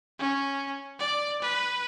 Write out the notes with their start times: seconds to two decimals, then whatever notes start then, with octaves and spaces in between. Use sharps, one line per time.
0.19 C#4
0.99 D5
1.42 B4